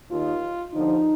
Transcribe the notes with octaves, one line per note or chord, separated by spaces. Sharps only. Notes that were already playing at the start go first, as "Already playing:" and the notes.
D#2 D#3 F4
D#2 D3 F3 D#4